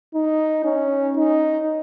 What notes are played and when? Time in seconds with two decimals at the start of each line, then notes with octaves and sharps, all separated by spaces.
0.14 D#4
0.64 C#4
1.16 D#4